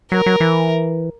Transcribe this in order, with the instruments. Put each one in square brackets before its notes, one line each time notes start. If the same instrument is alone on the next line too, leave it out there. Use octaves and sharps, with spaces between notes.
[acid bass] F#3 [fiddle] A#4
[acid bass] F#3
E3